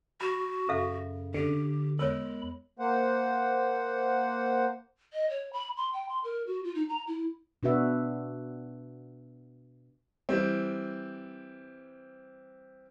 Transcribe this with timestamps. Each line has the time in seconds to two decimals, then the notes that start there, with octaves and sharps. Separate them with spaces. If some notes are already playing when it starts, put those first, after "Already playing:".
0.21 F#4 B5
0.69 F#2 C#3 A4 E5 F5
1.34 D3 G4
1.99 E2 G#3 A#4 C#5 B5
2.79 A#3 C5 F#5
5.13 D#5
5.30 C#5
5.53 B5
5.77 C6
5.93 G5
6.09 C6
6.24 A#4
6.47 F#4
6.64 F4
6.75 D#4
6.89 A#5
7.07 E4
7.63 B2 D4 F#4 B4 E5
10.29 E3 G3 C4